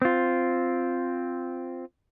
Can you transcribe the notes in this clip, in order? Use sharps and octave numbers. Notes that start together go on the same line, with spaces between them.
C4 F4